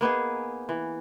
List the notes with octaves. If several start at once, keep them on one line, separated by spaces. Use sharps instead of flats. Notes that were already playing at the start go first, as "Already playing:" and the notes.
A#3 B3 D#4 G#4
E3